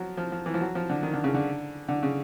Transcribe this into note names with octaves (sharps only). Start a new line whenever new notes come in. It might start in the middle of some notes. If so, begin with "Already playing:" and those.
Already playing: F3 F#3
F3
F3
E3
F3
F#3
F3
D3
D#3
D3
C#3
D3
D3
C#3